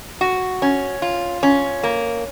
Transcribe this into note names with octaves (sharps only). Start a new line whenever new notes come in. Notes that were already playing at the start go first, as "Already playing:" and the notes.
F#4
C#4
F4
C#4
A#3